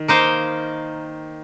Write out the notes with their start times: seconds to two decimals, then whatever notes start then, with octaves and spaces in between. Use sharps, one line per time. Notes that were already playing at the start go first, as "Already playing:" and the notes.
Already playing: D#3
0.08 A#3 D#4 C5 F5